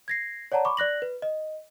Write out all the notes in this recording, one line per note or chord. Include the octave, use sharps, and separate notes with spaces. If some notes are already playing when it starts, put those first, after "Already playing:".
G#6 A#6 C7
C#5 D5 F#5 A5 A#5
B5 C#6 D6
D5 F#6 A#6 F#7
B4
D#5